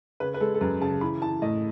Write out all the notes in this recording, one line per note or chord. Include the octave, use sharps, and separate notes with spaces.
C#3 B4
B4
G#3 A4
A4
F#2 B4
C#3 A5
E3 B5
E3 A5
A2 D#5